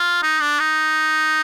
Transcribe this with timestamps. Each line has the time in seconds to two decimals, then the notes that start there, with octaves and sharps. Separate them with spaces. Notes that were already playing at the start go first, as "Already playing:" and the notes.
Already playing: F4
0.23 D#4
0.41 D4
0.60 D#4